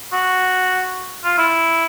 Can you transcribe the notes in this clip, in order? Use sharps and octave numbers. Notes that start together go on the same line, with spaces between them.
F#4
F4
E4